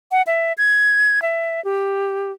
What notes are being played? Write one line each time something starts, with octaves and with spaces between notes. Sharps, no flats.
F#5
E5
G#6
E5
G4